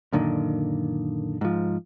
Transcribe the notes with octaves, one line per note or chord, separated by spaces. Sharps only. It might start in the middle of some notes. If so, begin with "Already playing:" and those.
F#2 A#2 D3 D#3
G#2 F3